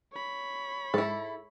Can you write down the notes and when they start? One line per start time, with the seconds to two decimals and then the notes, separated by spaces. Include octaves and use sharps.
0.13 C#5 B5
0.94 G#2 G#3 E4 A4